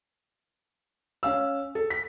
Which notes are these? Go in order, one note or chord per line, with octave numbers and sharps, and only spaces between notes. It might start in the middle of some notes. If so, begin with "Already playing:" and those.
C#4 F5 E6
A4
B6